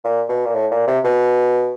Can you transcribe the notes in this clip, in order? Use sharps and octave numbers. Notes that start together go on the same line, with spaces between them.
A#2
B2
A#2
A2
A#2
C3
B2